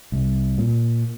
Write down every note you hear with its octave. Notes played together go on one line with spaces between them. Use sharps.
C2
A#2